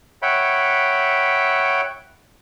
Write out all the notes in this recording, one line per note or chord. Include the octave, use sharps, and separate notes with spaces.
C#5 E5 F#5 G5 B5